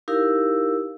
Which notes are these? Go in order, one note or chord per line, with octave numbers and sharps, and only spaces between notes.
D#4 E4 G4 A#4 F5 E6